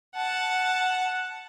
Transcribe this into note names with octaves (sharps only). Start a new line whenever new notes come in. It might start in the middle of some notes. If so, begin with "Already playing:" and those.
F#5 A5